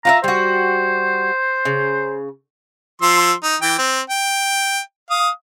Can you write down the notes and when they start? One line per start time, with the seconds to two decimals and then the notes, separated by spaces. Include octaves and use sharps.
0.05 F4 F#4 E5 A#5
0.24 G3 F#4 C5
1.65 C#3
3.02 F3 C6 E6
3.43 D#4
3.62 E3 G5
3.78 C4
4.10 G5
5.10 F5 D#6